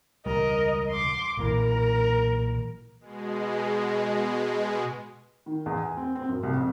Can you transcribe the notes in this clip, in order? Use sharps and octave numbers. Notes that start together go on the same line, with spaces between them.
E1 C#2 G3 A#4 D#5
C6 D6
B1 A#2 E3 A#4
B2 G#3
D#3
E2
G#5
C4
C4
F#2
C2
F2